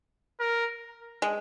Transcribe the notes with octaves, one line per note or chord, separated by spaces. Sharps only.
A#4
G#3